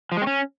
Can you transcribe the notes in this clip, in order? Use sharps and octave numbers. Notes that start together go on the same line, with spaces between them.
F3
G#3
C4
C#4